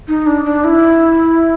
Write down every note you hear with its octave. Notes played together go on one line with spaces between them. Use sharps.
D#4
D4
D4
E4